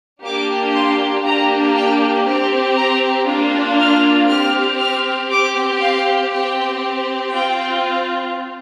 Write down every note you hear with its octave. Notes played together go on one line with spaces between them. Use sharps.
A#3 D4 G4 D6
C6
A#3 D4 G4 A#5
G5
C4 G4 G5
A#5
A#3 D4 F4
F6
C4 G4 F6
F6
C4 G4 D6
F5
C4 G4 G5
C4 F4 G5